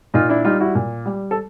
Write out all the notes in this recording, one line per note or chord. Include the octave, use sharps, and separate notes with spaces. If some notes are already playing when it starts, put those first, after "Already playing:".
A#2 D#4 F4
D4 E4
G3 D#4 F4
E4 F#4
A#2
G3
A4